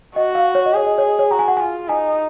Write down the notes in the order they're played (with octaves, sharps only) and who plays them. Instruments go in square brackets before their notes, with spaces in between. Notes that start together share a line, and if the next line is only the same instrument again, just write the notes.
[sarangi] F#4 [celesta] D#5
[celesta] F5
C#5
D#5
[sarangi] G#4 [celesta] C#5
[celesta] D#5
C#5
D#5
C#5
[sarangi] F#4 [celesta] A#5
[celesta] G#5
F#5
[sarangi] F4 [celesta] G#5
[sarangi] D#4 [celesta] G#5